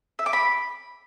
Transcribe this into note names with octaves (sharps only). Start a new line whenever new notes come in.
E5
D6
B5